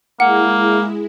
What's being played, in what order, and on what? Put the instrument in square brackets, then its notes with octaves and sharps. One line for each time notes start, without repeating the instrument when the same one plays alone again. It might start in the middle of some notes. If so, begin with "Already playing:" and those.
[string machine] G#3 E4 G#4 [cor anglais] A#3 [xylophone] F#5